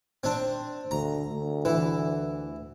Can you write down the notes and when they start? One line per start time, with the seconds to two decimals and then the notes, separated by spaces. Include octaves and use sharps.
0.24 C4 D4
0.91 D2 A#5
1.31 D2
1.65 E3